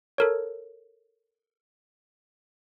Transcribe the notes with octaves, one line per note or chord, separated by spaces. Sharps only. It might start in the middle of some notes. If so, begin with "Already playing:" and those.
A4 A#4 C#5